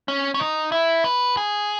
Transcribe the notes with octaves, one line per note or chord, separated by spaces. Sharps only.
C#4
C#4
D#4
E4
B4
G#4